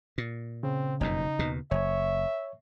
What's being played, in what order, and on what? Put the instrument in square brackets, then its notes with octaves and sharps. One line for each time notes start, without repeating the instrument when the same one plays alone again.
[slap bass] A#2
[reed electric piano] C#3 [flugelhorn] C4
[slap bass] F#1 F2 B2 [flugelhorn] D#4
[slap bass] D#2 B2
[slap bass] F#1 [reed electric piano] C#5 C#6 [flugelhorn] E5